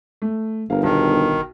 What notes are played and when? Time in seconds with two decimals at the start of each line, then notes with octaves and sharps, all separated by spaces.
0.22 A3
0.70 G1 A#4 F5
0.83 B1 D#3